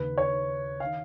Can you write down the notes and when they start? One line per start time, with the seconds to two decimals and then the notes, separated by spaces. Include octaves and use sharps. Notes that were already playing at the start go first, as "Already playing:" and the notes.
Already playing: D#2 C#3 B4
0.18 C#5
0.80 D#3 F5